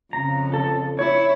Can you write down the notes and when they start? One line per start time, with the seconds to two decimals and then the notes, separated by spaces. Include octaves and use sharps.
0.13 F2 C#3 A#5
0.54 A4
0.99 E4 C#5